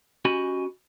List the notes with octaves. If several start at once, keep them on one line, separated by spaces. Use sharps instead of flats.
C#4 F#4 G4 D#5 G#5 B5